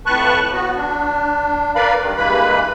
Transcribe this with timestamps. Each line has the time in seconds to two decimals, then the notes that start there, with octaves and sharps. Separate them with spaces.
0.06 F2 A2 B4 A5 C#6 F#6
0.53 B3 F#4
0.77 D4
1.75 A#4 B4 D5 F5 B5
2.01 G2 D#3
2.17 G2 E3 G#3 A#3 B4 B5